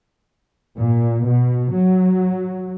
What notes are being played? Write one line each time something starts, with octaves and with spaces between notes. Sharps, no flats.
A#2
B2
F#3